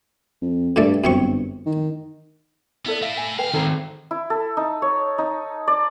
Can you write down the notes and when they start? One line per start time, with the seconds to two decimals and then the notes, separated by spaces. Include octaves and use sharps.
0.42 F2
0.76 G2 A#2 A3 D5
1.04 G1 F#2 C4 C#6
1.66 D#3
2.86 B3 E4 A4 D5
3.02 A3 E4 E5 F5
3.17 G#5
3.38 D2 B4 F5 G5 G#5
3.54 D#3 C4 A4 A#5
4.11 E4
4.30 A4
4.57 D#4
4.82 C#5
5.18 D#4
5.67 D5